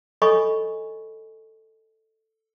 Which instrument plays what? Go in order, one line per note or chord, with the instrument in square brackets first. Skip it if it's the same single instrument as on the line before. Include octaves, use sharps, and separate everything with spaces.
[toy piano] A4 C#5 D#5 G#5 B5 C#6